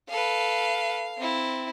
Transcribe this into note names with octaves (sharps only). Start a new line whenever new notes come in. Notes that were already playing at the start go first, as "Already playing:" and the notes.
A4 B4 F5
C4 E4